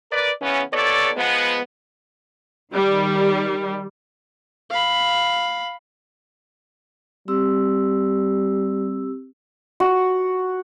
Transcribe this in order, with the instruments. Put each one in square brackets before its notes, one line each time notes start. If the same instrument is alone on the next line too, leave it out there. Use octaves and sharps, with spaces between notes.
[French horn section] A#4 B4 D5
C#3 E3 B3 C#4
D#2 B3 A4 C#5 D5
F3 G#3 B3
[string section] D#3 G3
[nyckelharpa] F5 B5
[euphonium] G3 [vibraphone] C4 G4 E6
[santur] F#4